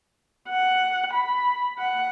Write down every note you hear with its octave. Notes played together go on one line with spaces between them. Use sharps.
F#5
B5
F#5